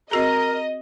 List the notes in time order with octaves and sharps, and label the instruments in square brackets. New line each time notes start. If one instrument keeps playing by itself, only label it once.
[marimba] C4 F#4 G#4 [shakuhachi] A#4 [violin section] D#5 [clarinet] A#5